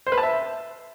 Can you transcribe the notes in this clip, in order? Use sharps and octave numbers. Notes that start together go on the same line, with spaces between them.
C5
B4
A5
E5